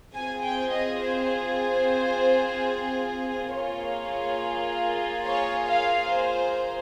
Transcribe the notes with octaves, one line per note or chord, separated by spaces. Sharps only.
C4 F4 G#4 G#5
G5
D#5
C5
C5
A#3 F4 G#4 C#5
C#5
F5
C5